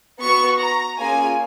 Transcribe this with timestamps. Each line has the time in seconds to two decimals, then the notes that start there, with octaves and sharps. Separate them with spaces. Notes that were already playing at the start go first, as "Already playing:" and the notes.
0.21 B3 F#4 C#6
0.59 A#5
0.98 A#3 C#4 F4 G#4 G#5